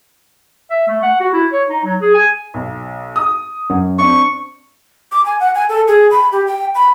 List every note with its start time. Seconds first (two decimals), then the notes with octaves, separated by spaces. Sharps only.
0.70 E5
0.87 A3
1.02 F#5
1.20 F#4
1.33 E4
1.52 C#5
1.69 D#4
1.84 F#3
2.01 G#4
2.14 G#5
2.54 B1
3.16 D#6
3.70 F#2
3.99 C4 D4 C#6
5.12 D6
5.26 G#5
5.40 F#5
5.55 G#5
5.69 A4
5.88 G#4
6.11 B5
6.32 G4
6.47 G5
6.75 B5